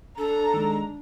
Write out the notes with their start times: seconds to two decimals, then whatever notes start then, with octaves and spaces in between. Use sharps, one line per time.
0.18 D4 A4 A#5
0.54 D#3 G#3